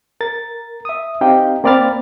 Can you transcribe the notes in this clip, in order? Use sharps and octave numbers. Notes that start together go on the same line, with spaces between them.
A#4 A6
E5 D#6
C4 D#4 G4 D#5 F5 G5
A#3 C4 D5 B5 F6 A6